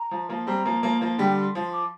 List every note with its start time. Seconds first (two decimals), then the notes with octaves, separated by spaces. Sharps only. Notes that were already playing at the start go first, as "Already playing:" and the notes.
Already playing: A#5
0.11 F3
0.29 F3 A#3
0.47 G3 C4 A#5
0.65 F3 A#3
0.83 F3 A#3
1.01 F3 A#3
1.18 D3 G3 G5
1.37 C6
1.55 F3 C6
1.72 D6